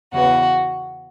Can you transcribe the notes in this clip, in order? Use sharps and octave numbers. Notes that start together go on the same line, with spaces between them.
E2 C#3 E3 B3 F#4